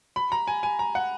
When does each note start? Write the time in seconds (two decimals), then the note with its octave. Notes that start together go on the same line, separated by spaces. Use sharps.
0.16 B5
0.32 A#5
0.48 G#5
0.63 G#5
0.79 A#5
0.95 F#5